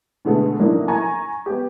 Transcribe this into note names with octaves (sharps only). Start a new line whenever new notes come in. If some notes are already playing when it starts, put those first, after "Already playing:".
B2 D3 G#3 A3 B3
A2 C#3 F#3 A#3 D4 D#4
G#5 A#5 C#6 G#6
B3 G4